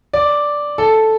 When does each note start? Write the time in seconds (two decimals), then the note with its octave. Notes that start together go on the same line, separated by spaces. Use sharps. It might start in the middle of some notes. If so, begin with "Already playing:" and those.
0.13 D5
0.78 A4